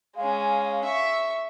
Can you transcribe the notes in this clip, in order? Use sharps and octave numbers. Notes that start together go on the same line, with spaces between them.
G#3 C#4 F5
E5 C#6